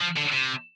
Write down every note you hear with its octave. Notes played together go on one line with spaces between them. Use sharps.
F3
D3
C3